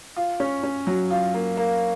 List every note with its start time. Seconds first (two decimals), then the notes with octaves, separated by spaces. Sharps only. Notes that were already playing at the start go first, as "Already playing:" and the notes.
0.16 F4
0.40 C#4
0.63 C#4
0.87 F#3
1.10 F4
1.34 A#3
1.57 A#3